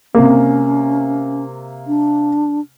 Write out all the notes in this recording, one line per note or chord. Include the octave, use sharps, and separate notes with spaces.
C3 A#3 C#4
D4